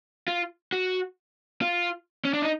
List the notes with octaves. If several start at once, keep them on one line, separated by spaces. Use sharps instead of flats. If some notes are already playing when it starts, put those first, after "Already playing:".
F4
F#4
F4
C#4
D4
D#4